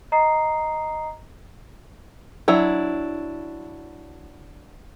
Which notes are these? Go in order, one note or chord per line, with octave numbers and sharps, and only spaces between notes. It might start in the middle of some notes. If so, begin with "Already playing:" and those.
D#5 A#5 D#6 C7
F#3 D4 E4